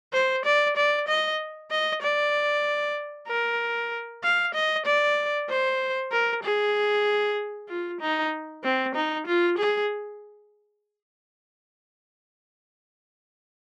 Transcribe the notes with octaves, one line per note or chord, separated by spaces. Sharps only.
C5
D5
D5
D#5
D#5
D5
A#4
F5
D#5
D5
C5
A#4
G#4
F4
D#4
C4
D#4
F4
G#4